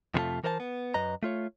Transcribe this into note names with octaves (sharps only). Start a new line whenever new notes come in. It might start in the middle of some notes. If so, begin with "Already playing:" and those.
F2 C3 E3 A3 F4 A5
E3 A#4 C5 D5 A5
B3
F#2 B4 D#5 A#5
A3 F4 C#5